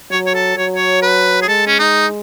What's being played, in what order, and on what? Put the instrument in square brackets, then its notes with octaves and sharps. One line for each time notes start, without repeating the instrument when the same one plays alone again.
[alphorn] F#3 [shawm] C#5
[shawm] C#5
A4
[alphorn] F#3 [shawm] C#5
[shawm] C#5
B4
G#4
[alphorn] G#3 [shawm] A4
[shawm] C#4
D#4